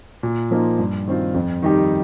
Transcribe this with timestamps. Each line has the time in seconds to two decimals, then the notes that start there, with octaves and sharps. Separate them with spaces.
0.23 A#2
0.51 F3 A#3 D#4
0.79 G2
1.07 D#3 C4 F4
1.34 F2
1.62 D#3 G3 D#4 G4